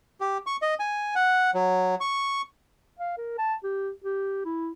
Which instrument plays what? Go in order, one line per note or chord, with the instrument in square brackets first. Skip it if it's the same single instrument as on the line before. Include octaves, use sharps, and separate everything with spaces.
[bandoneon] G4
C#6
D#5
G#5
F#5
F#3
C#6
[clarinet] F5
A#4
A5
G4
G4
E4